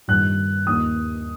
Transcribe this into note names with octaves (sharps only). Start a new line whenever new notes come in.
G2 D#3 F#6
D#2 D#3 D#6